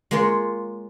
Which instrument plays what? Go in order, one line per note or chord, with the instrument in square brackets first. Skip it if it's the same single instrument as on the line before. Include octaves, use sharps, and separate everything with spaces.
[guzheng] G#3 A#3 F4 C#5